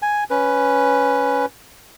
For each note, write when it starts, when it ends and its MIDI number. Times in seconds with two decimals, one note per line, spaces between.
0.02 0.24 80
0.30 1.46 61
0.30 1.46 71